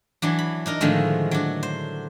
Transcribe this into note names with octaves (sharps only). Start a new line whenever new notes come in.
E3 F#3 D4
B5
D4 D#4 A#4
A2 D3 D#3 F3 G#3 A3
F#3 D4
C5